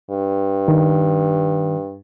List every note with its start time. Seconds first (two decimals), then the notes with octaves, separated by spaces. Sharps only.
0.11 G2
0.68 D#3